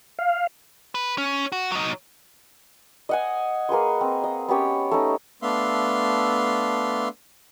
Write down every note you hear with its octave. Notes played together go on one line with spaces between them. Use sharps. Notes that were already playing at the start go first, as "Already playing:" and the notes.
F5
B4
C#4
F#4
F#3 D#4
D#5 F#5 G#5
A#3 G#4 B4 C6
C4
D#5
B3 C#4 G4 C#5
A3 C#4 D#4
A3 B3 D4 E5 F5 C6